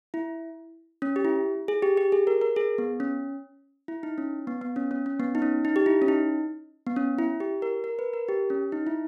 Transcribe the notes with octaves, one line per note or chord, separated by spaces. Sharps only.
E4
C#4
G4
E4
G#4
G4
G4
G#4
A#4
A#4
G#4
B3
C#4
E4
D#4
C#4
B3
B3
C#4
C#4
C#4
B3
D#4
C#4
D#4
G4
E4
C#4
D#4
B3
C#4
E4
G4
A#4
A#4
B4
A#4
G4
C#4
D#4
E4